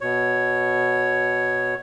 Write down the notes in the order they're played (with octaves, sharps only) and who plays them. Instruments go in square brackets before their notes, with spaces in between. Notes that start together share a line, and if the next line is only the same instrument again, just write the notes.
[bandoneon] B2 C#5